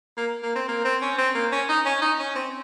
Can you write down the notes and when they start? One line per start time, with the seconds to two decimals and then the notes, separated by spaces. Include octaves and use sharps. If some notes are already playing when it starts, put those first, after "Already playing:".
0.17 A#3
0.43 A#3
0.55 C4
0.68 A#3
0.85 C4
1.02 C#4
1.18 C4
1.35 A#3
1.52 C#4
1.69 D#4
1.85 C#4
2.02 D#4
2.19 C#4
2.36 C4